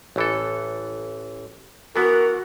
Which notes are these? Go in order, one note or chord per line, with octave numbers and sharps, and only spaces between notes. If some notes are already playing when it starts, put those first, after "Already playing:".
A1 E3 A4
E3 B3 F#4 A#4